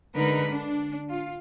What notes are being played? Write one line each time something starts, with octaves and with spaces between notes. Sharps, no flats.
D3 G#3 D#4 A#4 B4
D4
F4